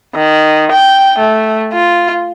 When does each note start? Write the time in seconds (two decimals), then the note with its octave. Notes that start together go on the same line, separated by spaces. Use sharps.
0.15 D#3
0.72 G5
1.18 A3
1.73 F4